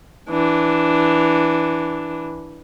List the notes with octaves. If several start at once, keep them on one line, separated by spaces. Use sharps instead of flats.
E3 D4